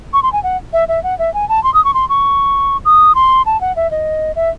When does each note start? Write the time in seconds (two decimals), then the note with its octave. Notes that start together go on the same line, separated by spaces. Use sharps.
0.13 C#6
0.23 C6
0.33 G#5
0.43 F#5
0.73 E5
0.88 E5
1.03 F#5
1.19 E5
1.34 G#5
1.49 A5
1.63 C6
1.74 D#6
1.84 C#6
1.94 C6
2.09 C#6
2.85 D#6
3.15 C6
3.46 A5
3.61 F#5
3.76 E5
3.91 D#5
4.36 E5